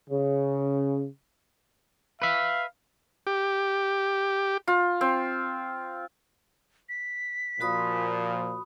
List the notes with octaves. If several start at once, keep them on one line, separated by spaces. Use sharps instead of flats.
C#3
B4 E5 F5
G4
F4
C4
B6
A#2 F3 F#4 B5 D#6